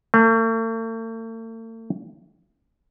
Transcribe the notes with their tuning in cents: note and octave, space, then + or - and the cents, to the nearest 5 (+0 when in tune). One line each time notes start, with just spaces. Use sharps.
A3 +45